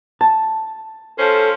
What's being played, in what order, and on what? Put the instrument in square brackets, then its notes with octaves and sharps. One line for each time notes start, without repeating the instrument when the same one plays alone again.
[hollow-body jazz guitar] A5
[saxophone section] F3 C#4 C5 [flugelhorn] A4